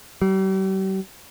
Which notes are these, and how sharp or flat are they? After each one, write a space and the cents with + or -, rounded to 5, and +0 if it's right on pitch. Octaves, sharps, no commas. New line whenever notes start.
G3 -40